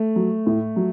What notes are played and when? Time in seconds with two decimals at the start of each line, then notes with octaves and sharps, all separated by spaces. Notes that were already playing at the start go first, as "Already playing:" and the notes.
Already playing: A3
0.16 F#3
0.46 A2
0.76 F#3